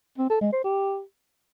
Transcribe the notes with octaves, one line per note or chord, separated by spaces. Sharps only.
C4
A4
G#3
C5
G4